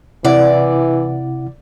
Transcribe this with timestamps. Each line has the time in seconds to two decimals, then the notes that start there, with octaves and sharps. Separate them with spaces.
0.25 C3 E3 E4 D5 F#5